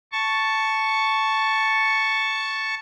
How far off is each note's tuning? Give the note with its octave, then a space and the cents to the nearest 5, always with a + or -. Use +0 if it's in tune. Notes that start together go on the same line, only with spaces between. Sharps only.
A5 +0 C#6 +0